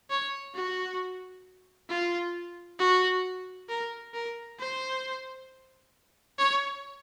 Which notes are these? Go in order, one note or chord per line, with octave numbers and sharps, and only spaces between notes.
C#5
F#4
F4
F#4
A#4
A#4
C5
C#5